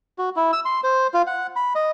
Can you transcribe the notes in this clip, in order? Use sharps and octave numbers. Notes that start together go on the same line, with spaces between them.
F#4
E4
E6
C6
C5
F4
F#5
B5
D#5